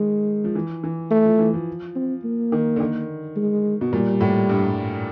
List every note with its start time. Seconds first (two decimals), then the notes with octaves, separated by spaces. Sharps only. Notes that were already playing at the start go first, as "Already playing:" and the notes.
Already playing: D#3 G#3
0.44 F3
0.55 E3
0.84 E3
1.11 A3
1.26 F3
1.39 E3
1.54 F3
1.95 C4
2.24 A#3
2.52 D#3
2.76 D3
2.80 D#3
3.36 G#3
3.81 B2
3.93 A#2 G3
4.21 A2
4.50 G2